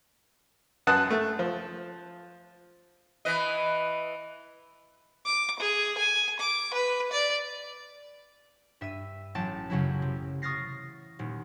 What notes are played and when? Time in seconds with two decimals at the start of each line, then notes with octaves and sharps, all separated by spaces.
0.87 F#2 B4 F#5 A5 D#6 F#6
1.10 A3
1.39 F3
3.25 E3 B4 D#5
5.25 D6
5.59 G#4
5.98 G#5
6.40 D6
6.74 B4
7.12 D5
8.81 G2 E5 E6 D#7
9.35 A1 F#3 G5 A5 A6
9.70 F#2 C#3 F#3 E4
10.02 C3
10.42 C#6 D#6 F6 A6 A#6 C7
11.19 D#1